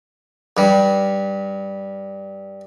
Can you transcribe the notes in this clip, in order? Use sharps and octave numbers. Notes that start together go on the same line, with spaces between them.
G2 G3